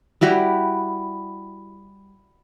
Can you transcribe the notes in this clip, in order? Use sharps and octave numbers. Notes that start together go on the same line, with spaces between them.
G3 E4 F#4 G4